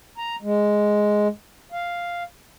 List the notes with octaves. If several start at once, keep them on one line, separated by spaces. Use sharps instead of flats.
A#5
G#3
F5